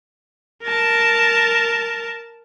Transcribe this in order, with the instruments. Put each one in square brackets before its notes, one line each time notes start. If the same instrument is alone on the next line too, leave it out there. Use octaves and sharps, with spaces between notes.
[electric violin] A#4 A5